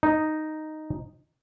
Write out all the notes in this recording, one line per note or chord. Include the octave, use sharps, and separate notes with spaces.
D#4